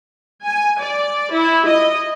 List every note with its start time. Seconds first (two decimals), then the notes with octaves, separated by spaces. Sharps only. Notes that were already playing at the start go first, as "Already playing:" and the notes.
0.45 G#5
0.81 D5
1.32 E4
1.67 D#5